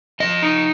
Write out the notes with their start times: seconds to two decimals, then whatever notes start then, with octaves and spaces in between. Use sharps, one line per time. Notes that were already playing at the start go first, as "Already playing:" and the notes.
0.20 F3 D#5
0.42 D#4